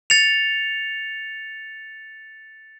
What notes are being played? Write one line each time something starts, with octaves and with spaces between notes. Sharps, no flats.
A6 C#7 F7